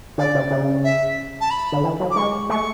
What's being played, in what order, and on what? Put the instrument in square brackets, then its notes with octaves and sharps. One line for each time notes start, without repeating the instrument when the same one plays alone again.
[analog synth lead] D3 [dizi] D5
[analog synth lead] C#3
C#3
[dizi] E5
A5
B5
[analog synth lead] D3
E3
F#3
[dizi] D6
[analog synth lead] G#3 [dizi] C#6
[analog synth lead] A3 [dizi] C#6